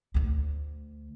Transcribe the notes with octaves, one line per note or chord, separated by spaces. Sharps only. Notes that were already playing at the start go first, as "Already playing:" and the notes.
D2 A3